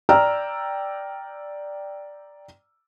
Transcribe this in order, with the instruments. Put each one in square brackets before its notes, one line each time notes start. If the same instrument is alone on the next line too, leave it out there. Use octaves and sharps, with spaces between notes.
[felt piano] D5 G5 A#5 E6 F6